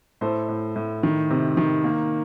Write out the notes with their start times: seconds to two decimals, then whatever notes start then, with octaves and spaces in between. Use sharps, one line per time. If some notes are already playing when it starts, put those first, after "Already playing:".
0.21 A2 A4 C5
0.48 A2
0.76 A2
1.03 D#3
1.30 C3
1.57 D#3
1.84 A#3